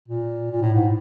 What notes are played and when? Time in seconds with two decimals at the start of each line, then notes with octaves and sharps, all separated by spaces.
0.08 A#2
0.51 A#2
0.61 A2
0.74 G#2